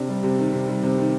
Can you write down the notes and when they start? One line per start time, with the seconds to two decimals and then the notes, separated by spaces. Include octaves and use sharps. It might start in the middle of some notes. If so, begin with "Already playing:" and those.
Already playing: C3 D4
0.08 G3
0.23 C3
0.39 D#3
0.53 C3
0.69 G3
0.83 C3
0.98 D#3